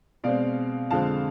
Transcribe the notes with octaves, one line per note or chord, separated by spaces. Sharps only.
B2 G#3 C4 D5 F5
F2 D3 G#3 C4 F5 A5